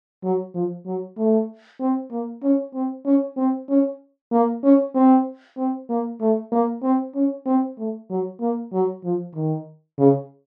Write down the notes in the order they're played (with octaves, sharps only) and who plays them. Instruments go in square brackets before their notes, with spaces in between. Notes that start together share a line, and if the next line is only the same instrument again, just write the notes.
[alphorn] F#3
F3
F#3
A3
C4
A#3
C#4
C4
C#4
C4
C#4
A#3
C#4
C4
C4
A#3
A3
A#3
C4
C#4
C4
A3
F#3
A#3
F#3
F3
D#3
C#3